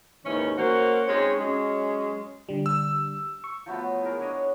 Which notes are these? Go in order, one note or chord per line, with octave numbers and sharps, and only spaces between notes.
D#2 G#2 E3 C#4
A#3 C#4 F#4 C5
G#3 C4 C#4 D#4 C#5
F#3 G#3 C#4
D3 G3
E6
C#6
F3 F#3 A3 B3
E4 G#4 A#4
B3 D4 C#5 D#5